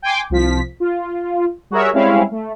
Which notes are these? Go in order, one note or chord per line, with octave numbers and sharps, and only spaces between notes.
G5 G#5 C6 D6
C2 F3 B6
F4
G3 F#4 G#4 A#4 C#5 E5
G3 G#3 C4 C#4 E4 F5
A3